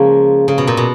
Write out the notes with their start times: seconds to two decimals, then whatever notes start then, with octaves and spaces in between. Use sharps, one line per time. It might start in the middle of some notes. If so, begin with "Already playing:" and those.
Already playing: C#3 F3 G#3 A#3
0.48 C#3
0.58 B2
0.67 A#2
0.77 B2